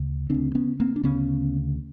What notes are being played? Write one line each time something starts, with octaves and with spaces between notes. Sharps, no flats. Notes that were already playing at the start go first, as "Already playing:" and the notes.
Already playing: D2 C#3
D2 C#3 C4 D4
B3 C#4
A#3 C4
D4
D2 C#3 B3 C#4